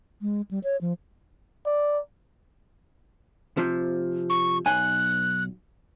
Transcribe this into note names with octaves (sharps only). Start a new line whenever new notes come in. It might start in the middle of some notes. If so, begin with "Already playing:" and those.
G#3
G3
C#5
F3
D5
C3 F3
C#6
B1 G#5 F#6